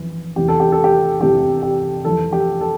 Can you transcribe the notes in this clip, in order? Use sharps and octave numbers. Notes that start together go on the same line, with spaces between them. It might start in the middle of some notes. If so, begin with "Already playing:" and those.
Already playing: F2 E3
E2 C3 E3 G4
A4
G4
A4
G4
E2 C3 E3 G4
G4
F2 E3 A4
G4
A4